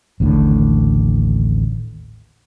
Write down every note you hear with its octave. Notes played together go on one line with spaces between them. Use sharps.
A1 D#2 A2 D3